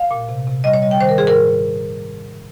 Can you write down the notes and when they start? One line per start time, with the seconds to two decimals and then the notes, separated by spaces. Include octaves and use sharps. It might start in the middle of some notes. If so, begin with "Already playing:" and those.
Already playing: F5
0.11 A#2
0.29 C3
0.47 C3
0.64 G3 D#5
0.74 C#5
0.82 G3 D#5
0.91 G5
1.00 D#3 C5
1.09 A#4
1.18 G#2 G#4
1.27 A#4